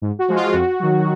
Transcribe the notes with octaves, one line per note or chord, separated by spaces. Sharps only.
G#2
F#4
F3 G#3
F4
F2 F#4
D#3 F#3